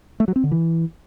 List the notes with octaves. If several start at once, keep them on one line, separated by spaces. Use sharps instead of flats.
A3
F#3
C4
D3
E3